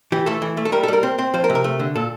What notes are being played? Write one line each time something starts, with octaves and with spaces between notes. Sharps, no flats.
E3 G4
A3 A4
E3
A3
A4
G3 A#4
A4
G3 A#4
C4
C4
F3 C5
A#4
C3
A#4
A3
D3
A#2 A4